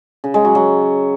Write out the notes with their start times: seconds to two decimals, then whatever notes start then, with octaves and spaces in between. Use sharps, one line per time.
0.24 C#3
0.34 G#3
0.45 F#3
0.55 F#3